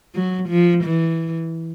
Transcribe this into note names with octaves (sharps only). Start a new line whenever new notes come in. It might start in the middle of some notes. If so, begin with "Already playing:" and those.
F#3
F3
E3